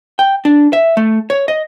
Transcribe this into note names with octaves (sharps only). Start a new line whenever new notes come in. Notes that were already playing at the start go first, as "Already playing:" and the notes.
G5
D4
E5
A3
C#5
D#5